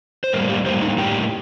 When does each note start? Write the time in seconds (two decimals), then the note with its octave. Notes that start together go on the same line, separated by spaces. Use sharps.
0.24 C5
0.33 A2 G3 A#3 A#4
0.49 G4
0.66 A2 G3 A#3 C5
0.82 D#4
0.98 A2 G3 A#3 G4